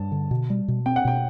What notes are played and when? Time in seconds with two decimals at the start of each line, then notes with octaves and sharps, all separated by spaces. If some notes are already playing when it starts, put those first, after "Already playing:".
Already playing: G2 A5
0.12 D3
0.31 B2
0.50 G3
0.68 B2
0.86 C4 G5
0.96 F#5
1.05 B2 G5